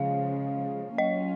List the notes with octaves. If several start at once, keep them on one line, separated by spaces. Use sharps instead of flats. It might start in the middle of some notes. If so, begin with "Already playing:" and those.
Already playing: C#3 F3 G#3 F5
F#3 A#3 C#4 F4 D#5